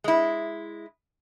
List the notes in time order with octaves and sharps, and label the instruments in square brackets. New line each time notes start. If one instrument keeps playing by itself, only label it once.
[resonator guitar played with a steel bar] G#3 E4